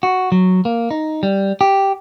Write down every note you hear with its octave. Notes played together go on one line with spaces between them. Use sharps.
F#4
F#3
A#3
D#4
G3
G4